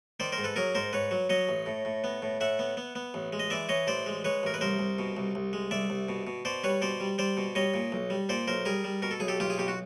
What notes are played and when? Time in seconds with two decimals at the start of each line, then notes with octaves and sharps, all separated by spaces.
0.20 D#3 C5 D5
0.32 A#4 C5
0.38 G#2
0.44 A4 B4
0.56 F#3 G#4 A#4
0.75 G#2 A#4 C5
0.93 G#2 B4 C#5
1.11 F#3
1.30 F#3 C#5 D#5
1.49 A1
1.66 A2
1.85 A2
2.04 B3
2.22 A2
2.40 A2 E5 F#5
2.59 B3
2.77 B3
2.95 B3
3.14 A1
3.33 G#3
3.39 D#5
3.50 E3 D5 E5
3.69 E3 C#5 D#5
3.87 A1 C5 D5
4.06 G#3
4.24 G#3 B4 C#5
4.43 A1 A#4
4.54 B4
4.61 C2 A#4 C5
4.79 C2
4.99 B2
5.17 C2
5.35 C2
5.53 G#3
5.71 C2 D5 E5
5.90 C2
6.09 B2
6.27 B2
6.45 B2 C5 D5
6.64 G3 B4 C#5
6.82 B2 C5 D5
7.00 G3
7.18 G3 C5 D5
7.37 B2
7.55 G3 C#5 D#5
7.74 A#2
7.92 B1
8.10 G3
8.29 A#2 C5 D5
8.48 B1 A#4 C5
8.65 G3 G#4 A#4
8.84 G3
9.02 B2 A#4
9.11 A4
9.20 B1 G#4
9.28 G4 A4
9.40 B1 F4 G4
9.50 G#4
9.58 B2 G4
9.68 F#4